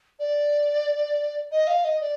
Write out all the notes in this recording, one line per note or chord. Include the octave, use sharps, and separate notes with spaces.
D5
D#5
F5
D#5
D5